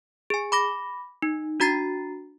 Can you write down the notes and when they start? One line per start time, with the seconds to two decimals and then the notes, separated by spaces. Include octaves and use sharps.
0.30 G#4 G#5
0.52 B5 D6 A#6
1.22 D#4
1.60 D4 F#4 A#5 A6 C7